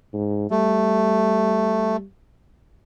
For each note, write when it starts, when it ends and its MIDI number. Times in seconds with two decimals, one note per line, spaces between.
0.13 0.50 44
0.51 2.04 55
0.51 1.97 57